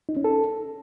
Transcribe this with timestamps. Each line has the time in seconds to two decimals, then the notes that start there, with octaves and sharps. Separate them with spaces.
0.09 D#4
0.17 C#4
0.24 A4